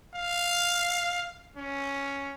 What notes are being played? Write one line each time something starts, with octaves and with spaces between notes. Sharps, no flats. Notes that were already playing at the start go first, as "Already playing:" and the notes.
F5
C#4